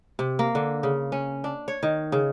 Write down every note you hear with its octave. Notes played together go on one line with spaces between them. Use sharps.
C3
A#3
D3
C#3
C#4
D4
C#5
D#3
C#3